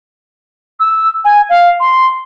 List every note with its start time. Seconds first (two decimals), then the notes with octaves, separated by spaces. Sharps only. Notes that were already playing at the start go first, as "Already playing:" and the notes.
0.80 E6
1.24 G#5
1.49 F5
1.80 C6